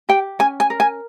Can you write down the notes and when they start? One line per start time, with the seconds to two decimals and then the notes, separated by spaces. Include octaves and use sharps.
0.09 G4 G5
0.39 C#4 G#5
0.60 G#5
0.70 A#4
0.80 G#5